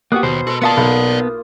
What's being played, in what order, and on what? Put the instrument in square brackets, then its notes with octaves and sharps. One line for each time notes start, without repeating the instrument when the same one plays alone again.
[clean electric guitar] A#3 B3 F#4 [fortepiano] G4 D#6 F#6
[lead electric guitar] D#2 [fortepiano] B2 [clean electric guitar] C5
[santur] G#3 A4 [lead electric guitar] F#4 B4
[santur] A#3 F4 D#6 [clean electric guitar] B3 E5 A5 [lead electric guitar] D5 F#5
[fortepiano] B1